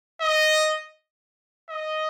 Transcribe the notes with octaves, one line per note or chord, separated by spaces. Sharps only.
D#5
D#5